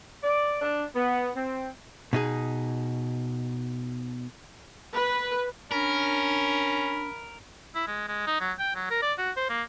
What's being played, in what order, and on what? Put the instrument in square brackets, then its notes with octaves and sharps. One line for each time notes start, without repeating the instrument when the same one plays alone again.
[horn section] D5
D4
B3
C4
[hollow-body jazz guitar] B2 D#4 G#4
[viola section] B4
[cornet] C#4 [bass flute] D4 [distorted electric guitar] A#4 [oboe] B5
[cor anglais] E4
G#3
G#3
D#4
F#3
G5
F#3
A#4
D5
F#4
C5
A#3